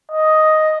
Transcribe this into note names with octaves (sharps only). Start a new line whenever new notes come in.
D#5